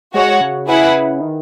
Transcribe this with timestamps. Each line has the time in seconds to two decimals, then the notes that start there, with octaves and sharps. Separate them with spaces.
0.14 G#3 F#4 C#5 F#5
0.41 C#3
0.68 E4 G#4 B4 F#5
1.21 D#3